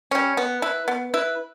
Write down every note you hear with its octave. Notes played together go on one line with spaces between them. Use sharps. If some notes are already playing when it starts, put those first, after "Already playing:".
G3 C#4
B3
E4 B4
B3
E4 B4